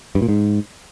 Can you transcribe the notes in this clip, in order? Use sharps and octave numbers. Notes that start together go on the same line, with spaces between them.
G2
A#2
G#2